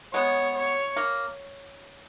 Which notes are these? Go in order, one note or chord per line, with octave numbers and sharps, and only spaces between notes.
G#3 B3 C#5
C#5
A#3